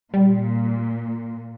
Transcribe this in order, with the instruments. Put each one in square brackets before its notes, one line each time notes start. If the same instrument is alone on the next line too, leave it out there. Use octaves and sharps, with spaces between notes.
[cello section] A#2 [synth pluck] G3